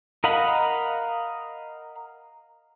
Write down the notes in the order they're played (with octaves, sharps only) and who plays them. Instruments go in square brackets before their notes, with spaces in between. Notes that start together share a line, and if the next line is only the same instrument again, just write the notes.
[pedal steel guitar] A#4 D#5 F5 F#5 B5